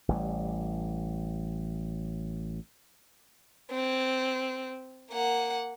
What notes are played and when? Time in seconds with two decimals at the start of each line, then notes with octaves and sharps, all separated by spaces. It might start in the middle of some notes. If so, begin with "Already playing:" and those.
0.09 A1 E3 G3
3.71 C4
5.11 A#3 F#5